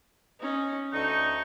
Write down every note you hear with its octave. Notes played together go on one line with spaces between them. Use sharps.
C#4 D#4
D2 D3 D#4 A4 C#6